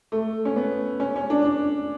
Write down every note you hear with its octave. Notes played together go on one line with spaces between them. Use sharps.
A3
C#4
B3
C#4
C#4
D4
D4